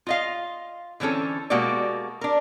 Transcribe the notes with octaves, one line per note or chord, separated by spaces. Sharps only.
F4 D#5 F5
D3 E3 C4 C#4 A4
B2 G#3 A#3 F#4 G4 D5
D4 A#4